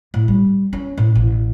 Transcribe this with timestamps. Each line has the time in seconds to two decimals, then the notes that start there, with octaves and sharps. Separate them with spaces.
0.14 A2
0.28 G3
0.73 C#4
0.98 A2
1.15 A1